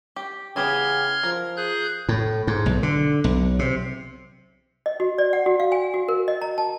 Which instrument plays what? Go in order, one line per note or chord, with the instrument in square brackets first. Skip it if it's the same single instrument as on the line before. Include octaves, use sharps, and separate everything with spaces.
[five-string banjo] G4
[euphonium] C#3 [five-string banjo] E3 B3 G4 [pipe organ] C6 F6 G#6
[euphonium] F3 [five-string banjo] A#4
[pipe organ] G#4 F#6 G6
[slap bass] A2
G#2
B1
D3
B1
C3
[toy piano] D#5
F#4
D5
F#5
F#4
F5
G#5
F#4
A#4
D#5
A#5
A5